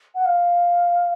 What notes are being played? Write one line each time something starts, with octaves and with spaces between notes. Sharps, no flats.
F#5
F5